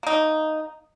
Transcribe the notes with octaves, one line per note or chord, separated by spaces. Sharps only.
A#3 D#4